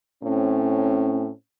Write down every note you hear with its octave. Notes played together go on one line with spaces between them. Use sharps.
A2 C4 C#4